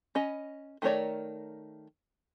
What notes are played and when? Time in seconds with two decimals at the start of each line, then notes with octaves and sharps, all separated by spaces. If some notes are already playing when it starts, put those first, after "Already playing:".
0.15 C#4 D#5 B5
0.82 D#3 A3 A#4 C#5 D5